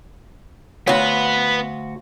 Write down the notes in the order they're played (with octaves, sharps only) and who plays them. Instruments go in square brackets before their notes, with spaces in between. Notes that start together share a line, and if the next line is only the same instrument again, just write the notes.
[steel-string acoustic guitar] D2 F#4 [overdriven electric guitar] B3 B4 [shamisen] C#5 [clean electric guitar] F5